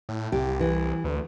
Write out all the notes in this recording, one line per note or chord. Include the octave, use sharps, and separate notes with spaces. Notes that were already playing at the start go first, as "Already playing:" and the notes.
A2
C2 G4
E3
D2